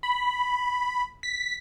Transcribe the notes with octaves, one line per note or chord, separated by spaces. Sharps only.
B5
B6